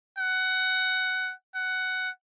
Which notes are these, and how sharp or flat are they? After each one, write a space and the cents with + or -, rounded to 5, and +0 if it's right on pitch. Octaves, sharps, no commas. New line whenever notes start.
F#5 +15
F#5 +10